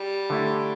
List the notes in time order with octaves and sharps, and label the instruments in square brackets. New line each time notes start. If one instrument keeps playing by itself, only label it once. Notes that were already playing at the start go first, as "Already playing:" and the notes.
Already playing: [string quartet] G3
[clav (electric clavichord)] D3 A3 E4